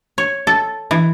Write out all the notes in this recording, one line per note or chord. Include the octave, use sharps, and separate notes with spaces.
C#5
A4
E3